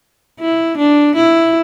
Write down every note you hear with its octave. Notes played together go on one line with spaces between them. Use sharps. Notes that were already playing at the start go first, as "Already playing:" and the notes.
E4
D4
E4